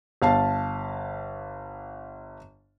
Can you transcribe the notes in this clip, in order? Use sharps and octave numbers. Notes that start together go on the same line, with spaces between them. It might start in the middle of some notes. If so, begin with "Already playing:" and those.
G1 F5 A5